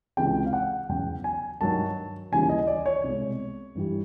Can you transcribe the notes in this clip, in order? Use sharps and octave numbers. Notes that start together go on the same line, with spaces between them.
C#2 C3 E3 G#3 G5
F5
F#5
E2 C#3 F#3 G5
G#5
G2 D#3 F#3 A5
D#2 C#3 E3 G3 G#5
D#5
D5
C#5
C2 B2 G#3
G2 E3 G3